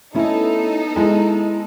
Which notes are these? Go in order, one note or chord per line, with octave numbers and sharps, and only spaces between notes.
A3 B3 C#4 D#4 E4 A4
G#3 E4 D#5